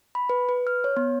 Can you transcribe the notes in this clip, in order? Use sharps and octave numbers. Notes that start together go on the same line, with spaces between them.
B5
B4
B4
F6
C#5
B3